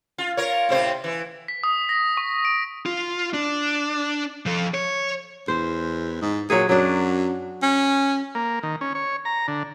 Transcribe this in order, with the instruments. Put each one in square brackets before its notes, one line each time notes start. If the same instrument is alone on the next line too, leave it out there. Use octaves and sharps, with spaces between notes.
[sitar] F4
F4 A#4 C#5
A2 C3 C5
E3
[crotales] B6
D#6
A#6
C#6
D7
[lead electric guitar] F4
D4
F3 A4
C#5
[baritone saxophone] E2 [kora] C5
[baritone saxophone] G#2
[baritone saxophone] A#2 [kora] F#3 G#4
[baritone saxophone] F#2 [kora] F#3 D4
[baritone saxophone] C#4
[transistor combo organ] A#3
D#3
C#4
C#5
A#5
D3